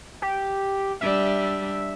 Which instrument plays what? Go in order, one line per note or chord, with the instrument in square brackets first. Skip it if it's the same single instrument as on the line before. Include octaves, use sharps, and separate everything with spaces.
[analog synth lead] G4
[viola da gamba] G3 D4 [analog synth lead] E5